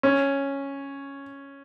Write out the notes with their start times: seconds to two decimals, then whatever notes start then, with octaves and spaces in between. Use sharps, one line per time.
0.03 C#4